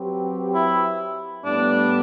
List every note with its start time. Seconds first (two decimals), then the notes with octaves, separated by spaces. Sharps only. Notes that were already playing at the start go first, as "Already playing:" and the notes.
Already playing: F#3 C4 G4 B4
0.54 E4
1.44 A2 G3 B3 D4